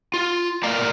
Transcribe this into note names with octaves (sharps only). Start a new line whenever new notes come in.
F4
A3 A#4 D5 F5 A#5